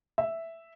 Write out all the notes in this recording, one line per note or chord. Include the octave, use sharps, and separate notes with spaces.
E5